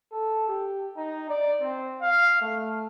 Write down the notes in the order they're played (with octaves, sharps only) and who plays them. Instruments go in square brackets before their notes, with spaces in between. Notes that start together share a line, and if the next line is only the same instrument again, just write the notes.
[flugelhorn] A4
G4
D#4
D5
C4
F5
A3